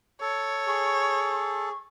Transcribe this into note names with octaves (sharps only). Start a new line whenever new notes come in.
A4 C#5
G#4 C#6